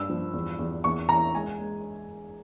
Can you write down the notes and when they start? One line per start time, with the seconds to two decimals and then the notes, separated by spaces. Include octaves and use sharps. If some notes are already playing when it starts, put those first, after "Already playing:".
Already playing: G2 E6
0.10 F3
0.33 E2
0.59 E2
0.84 E2 C#6
1.09 E3 A#5
1.35 G#3 G#5
1.60 G#3